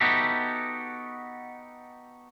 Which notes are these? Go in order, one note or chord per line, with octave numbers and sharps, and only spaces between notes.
B3 D#4 F#4 G4 A4 E5